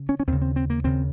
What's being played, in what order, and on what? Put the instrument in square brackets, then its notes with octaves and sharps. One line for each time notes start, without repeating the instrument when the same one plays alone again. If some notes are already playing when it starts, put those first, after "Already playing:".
Already playing: [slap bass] C#3
C#4
C#4
D#2 C#3 C4
C4
C4
A#3
D#2 C#3 C4